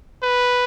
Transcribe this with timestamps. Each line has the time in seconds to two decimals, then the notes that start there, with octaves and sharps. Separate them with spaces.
0.23 B4